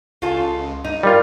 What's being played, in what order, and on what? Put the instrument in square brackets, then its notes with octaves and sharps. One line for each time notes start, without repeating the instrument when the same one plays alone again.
[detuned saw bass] C#2 [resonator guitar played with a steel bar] C#3 F4 A4
[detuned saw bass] G2 [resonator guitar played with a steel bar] D#4
[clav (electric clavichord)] G3 F4 [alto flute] A#4